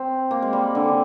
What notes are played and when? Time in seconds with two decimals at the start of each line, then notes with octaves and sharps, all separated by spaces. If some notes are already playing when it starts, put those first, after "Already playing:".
Already playing: C4
0.31 A#3
0.42 G#3
0.53 G3
0.75 D3